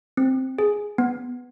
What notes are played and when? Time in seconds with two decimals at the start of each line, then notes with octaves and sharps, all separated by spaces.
0.17 C4
0.59 G#4
0.98 B3